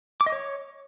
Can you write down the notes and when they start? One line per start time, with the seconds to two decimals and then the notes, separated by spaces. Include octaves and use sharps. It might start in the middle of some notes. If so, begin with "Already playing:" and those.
0.21 D6
0.26 D#5
0.32 C#5